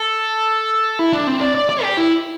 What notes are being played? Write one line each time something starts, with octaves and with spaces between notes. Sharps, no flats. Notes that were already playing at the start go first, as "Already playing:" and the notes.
Already playing: A4
E4
D4
C4
D5
D5
D5
G4
E4